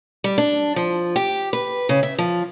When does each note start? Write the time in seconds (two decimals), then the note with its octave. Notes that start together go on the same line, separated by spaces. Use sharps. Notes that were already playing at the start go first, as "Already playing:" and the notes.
0.24 G3
0.38 D4
0.76 F3
1.16 G4
1.53 B4
1.89 C#3
2.03 E5
2.19 F3